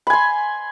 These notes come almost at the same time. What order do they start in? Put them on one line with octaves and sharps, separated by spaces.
B5 G#5 C6